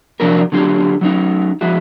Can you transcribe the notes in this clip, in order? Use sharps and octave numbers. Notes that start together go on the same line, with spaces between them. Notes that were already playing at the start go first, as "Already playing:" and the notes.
C3 F3 F#3 D4 F#4 A#4
D3 F#3 A3 F4 G4
F#3 C#4 D#4
F3 G#3 E4 F#4